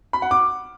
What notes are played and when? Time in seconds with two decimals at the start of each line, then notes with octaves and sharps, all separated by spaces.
0.13 B5
0.22 F#5
0.31 D6